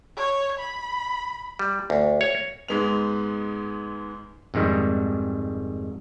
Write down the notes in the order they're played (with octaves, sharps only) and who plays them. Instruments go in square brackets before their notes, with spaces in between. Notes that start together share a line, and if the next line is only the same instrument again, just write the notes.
[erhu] C#5
B5
[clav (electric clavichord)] G3
D2
C#5
[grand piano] G#2 G#3 B3 F7
[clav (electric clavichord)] F2 G#2 D#3 G3